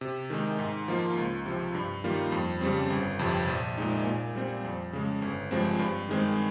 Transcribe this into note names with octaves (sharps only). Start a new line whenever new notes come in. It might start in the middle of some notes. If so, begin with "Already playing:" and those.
C3
D#3 G#3 D#4
G#2
F3 A#3 F4
C#2
C3 F3
G2
D#3 G3 A#3 F4
F2
C#3 G3 C4
G1
F2 C3
A#1
A#2 G#3 D#4
A#2
G3 C4
F2
C#3 G#3
G1
G2 F3 G#3 C4
G2
D#3 G#3 C4